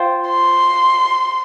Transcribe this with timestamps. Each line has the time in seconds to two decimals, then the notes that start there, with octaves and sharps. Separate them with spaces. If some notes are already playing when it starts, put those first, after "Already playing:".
Already playing: F4 C5 G5
0.29 C6